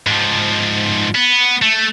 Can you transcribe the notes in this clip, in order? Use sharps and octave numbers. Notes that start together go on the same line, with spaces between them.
G#2 F3
B3
A3